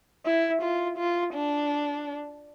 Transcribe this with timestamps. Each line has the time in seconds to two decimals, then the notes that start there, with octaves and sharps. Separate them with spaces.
0.26 E4
0.62 F4
0.98 F4
1.34 D4